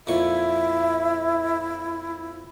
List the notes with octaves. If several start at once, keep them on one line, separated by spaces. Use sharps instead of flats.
F2 A#2 E4 E5 C#6